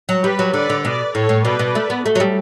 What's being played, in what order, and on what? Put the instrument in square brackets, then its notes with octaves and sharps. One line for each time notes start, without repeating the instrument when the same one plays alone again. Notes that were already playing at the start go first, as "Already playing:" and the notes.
[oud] F#3
[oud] G3 [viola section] G4 B4
[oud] F#3
[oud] D3 [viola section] B4 D5
[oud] D3
[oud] B2 [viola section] B4 D5
[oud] A2 [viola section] A4 C#5
[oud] A2
[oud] B2 [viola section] B4 D5
[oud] B2
A3
B3
[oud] A3 [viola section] F#4 A4
[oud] F#3
G3